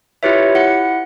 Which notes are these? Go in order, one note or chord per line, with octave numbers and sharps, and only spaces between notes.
E4 F4 G4 B4 C#5 E5
E4 F#5 C#7